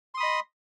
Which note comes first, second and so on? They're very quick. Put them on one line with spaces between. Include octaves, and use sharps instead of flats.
C6 D#6 B5 D#5